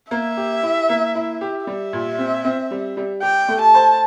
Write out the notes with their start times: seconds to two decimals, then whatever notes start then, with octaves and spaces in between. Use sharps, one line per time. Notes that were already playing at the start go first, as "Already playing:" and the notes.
0.11 A#3 E5
0.37 G4
0.63 E4
0.89 A#3
1.15 E4
1.41 G4
1.67 G3 E5
1.93 A#2
2.18 C4
2.44 C4
2.71 G3
2.97 G3
3.22 G4 G5
3.48 A3
3.62 A5
3.74 C5